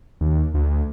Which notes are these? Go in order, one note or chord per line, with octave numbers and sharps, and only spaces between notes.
D#2
D2